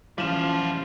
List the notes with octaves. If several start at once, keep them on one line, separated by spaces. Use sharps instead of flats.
E3 F3 G3 C#4 F4 E7